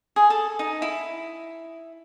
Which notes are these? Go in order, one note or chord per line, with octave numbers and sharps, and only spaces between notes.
G#4
A4
D#4
E4